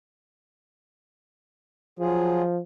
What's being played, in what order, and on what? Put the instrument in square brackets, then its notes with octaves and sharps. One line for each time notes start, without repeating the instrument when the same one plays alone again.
[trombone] F3 [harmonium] F#3 F4 G#4